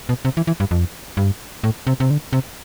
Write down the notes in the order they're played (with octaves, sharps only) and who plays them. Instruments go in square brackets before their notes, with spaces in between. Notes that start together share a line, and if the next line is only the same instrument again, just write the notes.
[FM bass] B2
C3
E3
E3
G2
F2
G2
A2
C3
C3
D3
C3